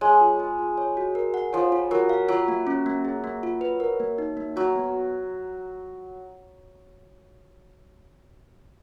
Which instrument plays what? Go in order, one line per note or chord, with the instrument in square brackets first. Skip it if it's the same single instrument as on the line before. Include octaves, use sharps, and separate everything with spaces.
[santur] G#3 [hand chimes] C#5
[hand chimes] F4
G#4
F4
C#5
F#4
A#4
F#5
[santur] F3 [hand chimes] C#5
[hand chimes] F4
[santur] F#3 [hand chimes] A#4
[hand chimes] F5
[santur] F#3 [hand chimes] F4
[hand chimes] A#3
C#4
A#3
G#4
A#3
F4
B4
A#4
A#3
D#4
A#3
[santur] F#3 [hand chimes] F#4
[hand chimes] B3